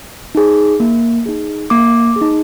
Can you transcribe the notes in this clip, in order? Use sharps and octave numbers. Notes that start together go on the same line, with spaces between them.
D#4 G#4
A#3
D#4 G#4
A#3 D6
G#4
D#4